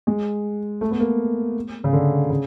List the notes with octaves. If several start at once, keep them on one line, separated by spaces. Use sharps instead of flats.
G#3
A3
B3
A#3
C#3
D3
C#3